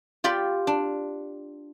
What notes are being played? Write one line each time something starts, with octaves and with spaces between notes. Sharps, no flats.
F4 G4 D5 B5
D4